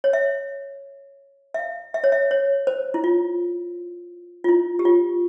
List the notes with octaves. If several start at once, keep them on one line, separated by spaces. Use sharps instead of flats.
C#5
E5
E5
F5
E5
C#5
E5
C#5
C5
E4
F4
F4
E4
G4
F4